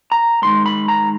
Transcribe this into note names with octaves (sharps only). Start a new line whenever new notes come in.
A#5
G2 D#3 G#3 C6
B5
A#5